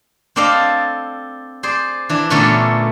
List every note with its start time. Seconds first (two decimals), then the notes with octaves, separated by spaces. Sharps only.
0.36 C4 D4 A4 D5 D#5 F5
1.63 G#4 C5 D5
2.09 E3 D4
2.30 A#2 D3 A3 B3 C#4 A4